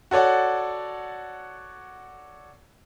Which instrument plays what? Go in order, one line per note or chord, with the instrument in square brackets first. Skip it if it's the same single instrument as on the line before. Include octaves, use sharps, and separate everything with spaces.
[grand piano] F#4 A4 C#5 D5 F#5